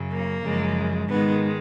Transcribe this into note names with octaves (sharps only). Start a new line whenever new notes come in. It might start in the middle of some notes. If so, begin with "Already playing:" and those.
Already playing: F#2 C#3 F#3
A#3
F#2 C#3 F3 G#3
G#2 D#3 G#3 B3